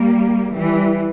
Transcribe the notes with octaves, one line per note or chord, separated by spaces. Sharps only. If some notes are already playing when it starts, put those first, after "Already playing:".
Already playing: G3 A#3
E3 G3